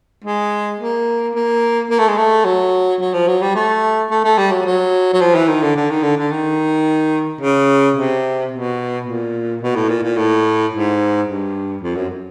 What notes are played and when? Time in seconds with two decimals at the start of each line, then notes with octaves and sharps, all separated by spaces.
0.24 G#3
0.80 A#3
1.35 A#3
1.90 A#3
1.99 A3
2.08 G#3
2.17 A3
2.45 F#3
3.01 F#3
3.13 F3
3.28 F#3
3.42 G3
3.55 A3
4.11 A3
4.24 A3
4.38 G3
4.51 F#3
4.66 F#3
5.13 F#3
5.21 F3
5.35 E3
5.48 D#3
5.62 D3
5.76 D3
5.90 D#3
6.03 D3
6.17 D3
6.31 D#3
7.41 C#3
7.97 C3
8.52 B2
9.07 A#2
9.62 B2
9.76 A2
9.89 A#2
10.03 A#2
10.17 A2
10.72 G#2
11.27 G2
11.83 F2
11.96 F#2